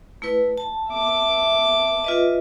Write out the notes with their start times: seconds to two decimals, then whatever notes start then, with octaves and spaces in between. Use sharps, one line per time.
0.22 A3 E4 B4
0.58 A5
0.90 E5 D6
2.04 F4 B4 D#5